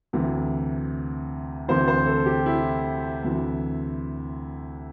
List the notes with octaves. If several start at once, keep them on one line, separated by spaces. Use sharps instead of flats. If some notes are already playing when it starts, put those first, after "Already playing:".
D2 C3 E3
D2 C3 E3 C5
C5
A4
G4
E4
D2 C3 E3